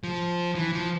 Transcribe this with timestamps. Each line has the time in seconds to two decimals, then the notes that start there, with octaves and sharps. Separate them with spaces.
0.04 F3
0.56 E3
0.73 F3